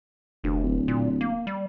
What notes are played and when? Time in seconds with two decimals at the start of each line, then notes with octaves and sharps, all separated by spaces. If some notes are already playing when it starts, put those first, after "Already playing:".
0.44 F1 D2
0.63 D1
0.88 A#2
1.21 A#3
1.47 G3